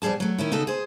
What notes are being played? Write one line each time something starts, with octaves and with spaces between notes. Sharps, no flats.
F2 B2 G3 G#4 A5
F#3 A3
D#3 C#4 E4
C#3 D#4 F#4 A4
G#4 C5